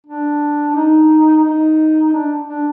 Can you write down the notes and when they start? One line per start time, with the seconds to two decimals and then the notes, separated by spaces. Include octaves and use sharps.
0.07 D4
0.75 D#4
1.44 D#4
2.13 D4
2.47 D4